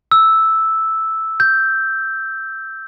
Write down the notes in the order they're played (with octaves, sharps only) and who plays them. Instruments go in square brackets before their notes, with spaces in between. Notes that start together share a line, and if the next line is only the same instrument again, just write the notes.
[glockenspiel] E6
G6